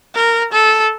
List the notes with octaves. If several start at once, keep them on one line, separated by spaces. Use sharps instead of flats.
A#4
A4